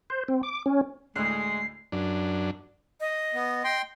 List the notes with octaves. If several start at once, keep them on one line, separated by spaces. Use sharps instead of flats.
C5
C4
D6
C#4
D2 A2 G#3 F#6 C7
F#2 D4
D#5
B3
G5 C6